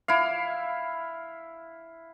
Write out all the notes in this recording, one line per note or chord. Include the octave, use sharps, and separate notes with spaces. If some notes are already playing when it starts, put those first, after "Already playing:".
E4 F5